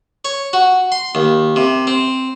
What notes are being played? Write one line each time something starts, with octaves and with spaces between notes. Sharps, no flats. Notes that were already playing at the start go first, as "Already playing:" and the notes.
C#5
F#4
C6
D#2
C3
C4